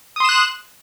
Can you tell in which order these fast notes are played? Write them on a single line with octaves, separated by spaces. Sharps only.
D#6 C6 E7 F#6